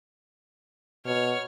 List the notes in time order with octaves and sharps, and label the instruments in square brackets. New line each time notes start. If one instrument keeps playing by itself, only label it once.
[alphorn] B2 [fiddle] C#5 F6